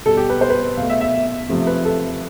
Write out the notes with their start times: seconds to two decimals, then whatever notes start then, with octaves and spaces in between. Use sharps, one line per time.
0.06 B2 G3 A4
0.17 G4
0.30 B4
0.41 C5
0.50 B4
0.77 B2 A3 F5
0.90 E5
1.01 E5
1.49 C3 F3 A3
1.67 B4
1.85 A4